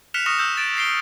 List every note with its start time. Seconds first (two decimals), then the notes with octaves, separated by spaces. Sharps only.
0.14 F6 F#6 B6 C#7 E7 F7
0.26 C#6 D#6 F6 A#6 C#7 E7
0.39 E6 G6 E7
0.57 A6 D7 E7
0.77 A#6 C7 D7 G7